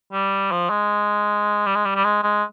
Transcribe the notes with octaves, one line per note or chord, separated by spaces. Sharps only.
G3
F3
G#3
G3
G#3
G3
G3
G#3
G#3